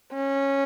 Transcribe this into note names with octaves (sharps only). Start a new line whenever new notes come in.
C#4